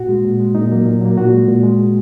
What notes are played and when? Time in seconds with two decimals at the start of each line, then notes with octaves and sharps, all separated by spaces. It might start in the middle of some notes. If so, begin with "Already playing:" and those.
Already playing: A#2 F#4
0.09 G#3
0.25 A#2
0.40 G#3
0.55 A#2 D#4
0.71 F#3 A#3
0.86 A#2
1.01 F#3 A#3
1.17 A#2 F#4
1.33 G#3
1.48 A#2
1.63 G#3